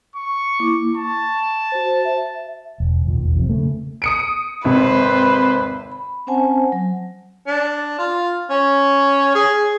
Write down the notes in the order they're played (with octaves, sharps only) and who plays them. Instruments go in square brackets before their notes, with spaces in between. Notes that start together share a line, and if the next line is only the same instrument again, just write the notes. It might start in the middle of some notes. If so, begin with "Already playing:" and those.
[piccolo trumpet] C#6
[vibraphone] A#3 E4 D6
[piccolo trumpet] A5 [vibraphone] C#6
[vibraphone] F#4 C5
E5
[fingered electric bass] E1
E1 A1 D#2 A#2
F2 C3
C#3 A3
[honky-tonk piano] D#6 C#7 D7
[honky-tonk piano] G#1 C3 [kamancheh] B4 C5
[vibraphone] B5
C4 C#4 C5 F#5 G#5 A5
F#3
[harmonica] D4
F4
C#4
G#4